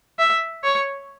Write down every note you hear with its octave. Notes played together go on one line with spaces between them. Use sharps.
E5
C#5